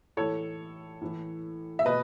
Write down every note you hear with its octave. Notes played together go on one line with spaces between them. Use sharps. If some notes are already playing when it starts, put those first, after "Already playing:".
A2 E3 A4 C#5
A2 E3
E5
B2 B4 D#5